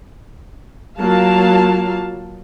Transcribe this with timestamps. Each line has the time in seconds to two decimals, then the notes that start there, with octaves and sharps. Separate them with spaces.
0.98 F#3 A#3 F4 F5 A5